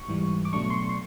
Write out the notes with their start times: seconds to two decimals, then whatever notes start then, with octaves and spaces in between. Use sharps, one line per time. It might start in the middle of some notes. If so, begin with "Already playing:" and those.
Already playing: C#6
0.08 G#2 E3 G3
0.45 D6
0.53 B2 F#3 A3 D4 C#6
0.70 C6
0.74 C#6
0.89 C6